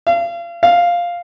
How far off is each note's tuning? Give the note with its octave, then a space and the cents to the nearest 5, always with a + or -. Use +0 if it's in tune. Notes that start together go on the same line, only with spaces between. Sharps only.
F5 -35
F5 +0